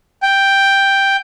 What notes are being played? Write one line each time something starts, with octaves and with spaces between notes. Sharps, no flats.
G5